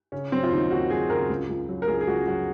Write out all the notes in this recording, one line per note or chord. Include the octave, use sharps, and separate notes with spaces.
C#3 C#4
F#3 C4
F4
D#2 D#4
D#2 F#4
F#3 G#4
C#3 A#4
C#2
C#2
F#3
A#4
C#2 G#4
G#4
C#2 F#4
F#3 F#4